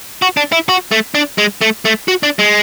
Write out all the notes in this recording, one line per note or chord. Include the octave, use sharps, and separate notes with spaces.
F#4
D4
E4
F#4
A3
D4
G#3
A3
A3
F#4
D4
G#3